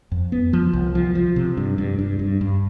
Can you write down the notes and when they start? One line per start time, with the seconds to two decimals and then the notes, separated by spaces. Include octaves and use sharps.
0.12 F2
0.32 B3
0.53 F3
0.73 C2
0.95 F3
1.15 F3
1.36 C3
1.57 G2
1.78 G2
1.99 G2
2.19 G2
2.41 G2